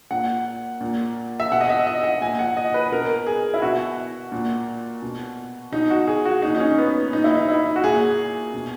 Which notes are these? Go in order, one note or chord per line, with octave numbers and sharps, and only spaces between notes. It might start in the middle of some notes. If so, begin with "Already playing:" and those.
A#2 F#5
A#2
E5
B2 F#5
D#5
E5
D#5
F#5
A#2 G#5
F#5
D#5
B4
B2 A#4
G#4
E4
B2 F#4
A#2
B2
B2 D#4
F#4
G#4
F#4
A#2 D#4
D#4
C#4
B3
A#2 D#4
E4
D#4
E4
F#4
A#2 G#4
B2